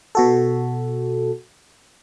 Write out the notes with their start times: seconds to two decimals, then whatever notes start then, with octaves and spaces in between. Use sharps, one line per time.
0.15 B2 F#4 A4